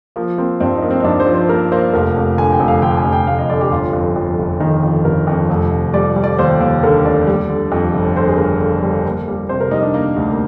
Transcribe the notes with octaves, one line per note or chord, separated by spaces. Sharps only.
F3 A#3
A#3 C4
G2 C4
D#4
A#3
C4
D#4
G2 D4
C5
F3
C5
A#3 A#4
A#3 C5
F1 A#4
F1
D3 G#5
G5
F1
F5
D3 G5
G#5
F1
G5
F1 F5
D#5
D3 D5
G4
G1 F4
F2
F2
G1
D#3 D#4
F2
G1 A#4
F2
F1
F1
G3 D5
G3
D5
D#2 C5
D#2
D3 A#4
F1 D5
G3
D3
F2
G1
D3 C5
G#4
G3 A#4
D3
G3
A#3
G3
C3 C5
A#4
G3 D#4
D4
A#3
D2
A#3